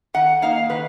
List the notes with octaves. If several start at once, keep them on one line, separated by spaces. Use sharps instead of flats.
D#3 F#5
A#3 D#4 F5
D#3 B4